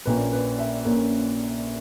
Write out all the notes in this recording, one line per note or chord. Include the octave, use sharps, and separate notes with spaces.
A#1 A#2 A#3 C#4 B4
B4
E5
A#1 A#2 A#3 C#4